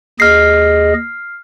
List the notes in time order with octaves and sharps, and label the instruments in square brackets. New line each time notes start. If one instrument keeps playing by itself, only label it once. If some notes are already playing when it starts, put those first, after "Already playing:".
[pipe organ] D#2 G#4 D#5 [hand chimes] F6 C7